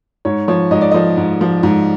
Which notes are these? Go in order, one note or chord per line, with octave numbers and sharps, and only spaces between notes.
G#2 C#5
F3 C#5
G#2 D#5
D5
F3 D#5
G#2
F3
G#2